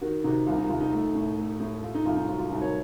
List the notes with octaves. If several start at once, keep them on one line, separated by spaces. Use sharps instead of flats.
D#3 F#4 A#4
C3 D#4 F#4
C2 F4
D#4
C2 F4
D#4
A3
A2
A3
A2
A3 F4
D#4
C2 F4
D#4
F#3 F4
F4
C2 D#4 F#4
A#4 C#5